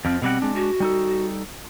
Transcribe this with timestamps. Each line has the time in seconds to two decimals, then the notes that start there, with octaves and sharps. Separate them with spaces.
0.05 F2 F3 C4
0.22 B2 G3 C4 F#5
0.42 G#3 D4
0.55 F#4
0.80 G3 D#4 A4